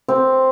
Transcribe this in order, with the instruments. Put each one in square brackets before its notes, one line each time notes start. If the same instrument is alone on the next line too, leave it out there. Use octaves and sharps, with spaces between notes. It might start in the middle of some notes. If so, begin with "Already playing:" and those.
[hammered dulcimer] C4